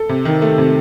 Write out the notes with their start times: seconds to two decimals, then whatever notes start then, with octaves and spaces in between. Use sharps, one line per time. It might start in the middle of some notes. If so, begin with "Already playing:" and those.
Already playing: A4
0.09 C3
0.25 D#3
0.42 A3
0.58 C3